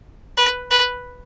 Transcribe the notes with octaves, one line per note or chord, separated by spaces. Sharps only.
B4
B4